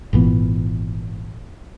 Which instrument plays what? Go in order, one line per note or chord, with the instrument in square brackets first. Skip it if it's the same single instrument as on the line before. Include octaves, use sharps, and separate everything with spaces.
[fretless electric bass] G#1 A#2 E3 B3